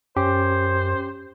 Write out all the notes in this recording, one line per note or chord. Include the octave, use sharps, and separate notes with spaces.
F#2 C#4 G4 C5